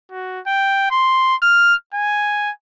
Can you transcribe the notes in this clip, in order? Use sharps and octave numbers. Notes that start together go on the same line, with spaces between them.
F#4
G5
C6
F6
G#5